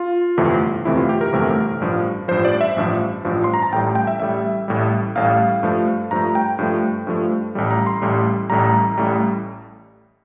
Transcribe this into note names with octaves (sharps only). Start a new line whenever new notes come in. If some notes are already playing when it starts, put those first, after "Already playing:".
Already playing: F4
G1 F2 C3 E3 A3
G1 F2 C3 E3 A3 E4
F4
G4
A#4
G1 F2 C3 E3 A3
A1 G2 F3
A1 G2 F3 C5
D5
E5
A1 G2 F3
A1 G2 F3
C6
A#5
A5
A1 A2 G3 G5
G5
E5
A1 A2 G3 E5
A1 A2 G3
A1 A2 G3 F5
G2 F3 A3
G2 F3 A3 A#5
G5
G2 F3 A3
G2 F3 A3
A1 A2 G3
A#5
C6
A1 A2 G3
A1 A2 G3 A#5
A1 A2 G3